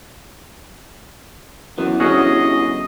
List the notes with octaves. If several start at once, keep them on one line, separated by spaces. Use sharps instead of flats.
F#2 E3 B3
G1 C#4 E4 F#4 G#4 D#5